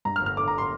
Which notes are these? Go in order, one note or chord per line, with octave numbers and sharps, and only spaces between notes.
G2 A#5
F6
G1
F6
D3 D6
A#5
C6